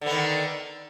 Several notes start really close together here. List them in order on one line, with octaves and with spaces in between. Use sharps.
D3 B3 D#3